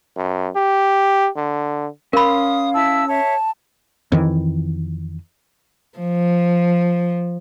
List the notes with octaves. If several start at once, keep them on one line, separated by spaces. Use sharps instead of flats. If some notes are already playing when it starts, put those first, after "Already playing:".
F#2
G4
D3
C#4 A#4 F5 B5 C6 D#6
E4 A5 E6
C#5 E5 A5
F2 D#3 E3
F3